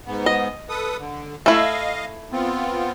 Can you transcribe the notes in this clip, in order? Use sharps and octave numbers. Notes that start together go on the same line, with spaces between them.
G#2 B3
D#5
A4 B4 D#6
D3
A3 E4 D#5 F5
B3 C4 F4